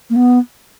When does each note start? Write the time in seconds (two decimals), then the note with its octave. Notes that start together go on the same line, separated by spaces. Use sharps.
0.10 A#3
0.16 B3